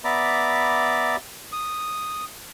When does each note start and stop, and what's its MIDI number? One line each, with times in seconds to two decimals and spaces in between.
0.04 1.16 59
0.04 1.16 74
0.04 1.16 76
0.04 1.16 82
0.04 1.16 83
0.04 1.16 86
1.52 2.25 87